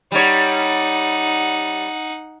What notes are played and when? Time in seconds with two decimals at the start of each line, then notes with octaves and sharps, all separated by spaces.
0.12 G3 D#4 C#5 F#5